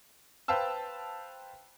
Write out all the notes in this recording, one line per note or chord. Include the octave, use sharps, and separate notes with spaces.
B4 C5 F5 G5 A5 E6